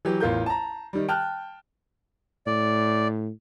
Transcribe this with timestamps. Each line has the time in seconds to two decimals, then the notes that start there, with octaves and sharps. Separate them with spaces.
0.05 E3 F#3 G4
0.20 A1 E2 F4 A#4 G6
0.46 A5 A#5
0.93 D#3 G3
1.08 G5 A5 F6 F#6
2.47 A2 D5